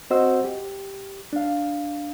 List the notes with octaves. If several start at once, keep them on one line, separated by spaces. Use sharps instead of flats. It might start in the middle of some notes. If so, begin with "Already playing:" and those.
C4 F#4 C5 D#5 F#5 E6
G4
D4 F5